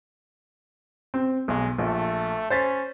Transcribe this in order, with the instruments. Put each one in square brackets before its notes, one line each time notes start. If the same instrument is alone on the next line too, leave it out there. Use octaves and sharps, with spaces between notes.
[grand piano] C4
[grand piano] B1 [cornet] G#3
[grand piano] A#1 [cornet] A3
[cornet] C#4 [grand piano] C5 A6 B6